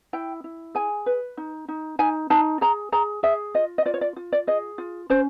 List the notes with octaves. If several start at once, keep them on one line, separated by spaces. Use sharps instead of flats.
E4 G5
E4
G#4 G#5
B4
D#4
D#4
D#4 G#5
D#4 A5
G#4 A#5
G#4 A#5
G#4 E5
F4 D#5
D#5
F4 D5
C#5
D5
F4
D5
G#4 D#5
F4
C#4 C5